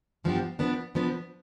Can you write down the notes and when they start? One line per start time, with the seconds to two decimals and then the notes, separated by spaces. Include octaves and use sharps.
0.24 G2 F3 B3 D4 G4
0.59 F3 B3 D4
0.95 F3 B3 D4